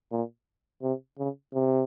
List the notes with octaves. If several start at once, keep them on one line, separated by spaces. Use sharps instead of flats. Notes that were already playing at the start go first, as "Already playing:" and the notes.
A#2
C3
C#3
C3